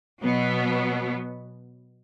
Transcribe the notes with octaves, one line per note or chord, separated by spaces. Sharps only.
B2 F#3 B3